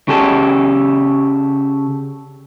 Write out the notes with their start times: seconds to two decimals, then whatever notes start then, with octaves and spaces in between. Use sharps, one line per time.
0.08 C#3 G4 A4